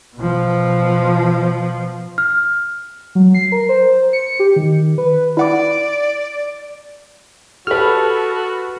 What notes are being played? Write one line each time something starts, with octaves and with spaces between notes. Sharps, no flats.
B2 F3
F6
F#3
C7
A#4
C5
C#7
G4
D#3
B4
E4 D5 F#5 D6
F#4 G4 A4 B4 B5 F6